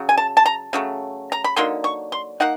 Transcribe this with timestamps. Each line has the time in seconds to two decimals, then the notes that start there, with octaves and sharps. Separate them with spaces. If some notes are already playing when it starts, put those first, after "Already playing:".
Already playing: C#3 F#3
0.09 G#5
0.17 A5
0.37 A5
0.46 A#5
0.73 C#3 F#3 A3
1.32 A#5
1.44 B5
1.56 D3 F#3 A#3 D#4 C6
1.84 C#6
2.12 C6
2.40 A#3 D#4 F#5